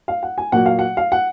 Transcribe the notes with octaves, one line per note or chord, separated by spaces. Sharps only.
F5
F#5
G#5
A#2 F#3 A#3 F#5
F5
F#5
F5
F#5